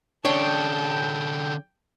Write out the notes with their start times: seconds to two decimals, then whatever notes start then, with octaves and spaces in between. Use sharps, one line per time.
0.25 D3 C#4 D4 C#5 G5 A5